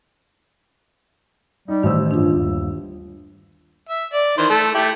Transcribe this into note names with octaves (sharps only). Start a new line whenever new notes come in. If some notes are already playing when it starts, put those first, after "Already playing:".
G3 D#4
A1 D#3 C5 E6
G2 D4 F4
G1 D#2
E5
D5
D#3 E3 C5
A3 A4
A3 E4 G4